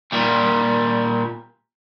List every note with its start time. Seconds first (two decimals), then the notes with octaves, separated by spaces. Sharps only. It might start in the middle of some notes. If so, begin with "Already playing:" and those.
0.12 A#2 G3